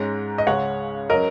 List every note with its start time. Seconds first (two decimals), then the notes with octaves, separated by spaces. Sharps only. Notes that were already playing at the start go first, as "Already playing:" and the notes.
Already playing: G#2 G#3 C#4 A#5
0.38 D#5
0.47 C#2 C#3 G#3 C#4 C#5 F#5
1.10 F#3 C#4 A#4 D#5